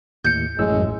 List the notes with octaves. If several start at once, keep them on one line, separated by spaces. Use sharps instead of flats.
D#2 A2 G6 C#7
A1 F#2 A2 G#3 E6